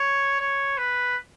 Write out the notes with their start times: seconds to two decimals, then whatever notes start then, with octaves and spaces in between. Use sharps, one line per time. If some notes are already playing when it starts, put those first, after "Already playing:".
Already playing: C#5
0.40 C#5
0.78 B4